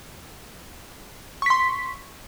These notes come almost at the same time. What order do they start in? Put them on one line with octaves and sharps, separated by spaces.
C#6 B6 C6